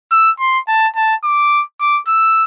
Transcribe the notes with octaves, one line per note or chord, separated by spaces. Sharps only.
E6
C6
A5
A5
D6
D6
E6